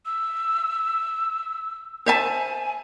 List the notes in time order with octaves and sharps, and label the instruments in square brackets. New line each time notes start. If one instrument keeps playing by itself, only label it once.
[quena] E6
[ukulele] C5 E5 A5 [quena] G#5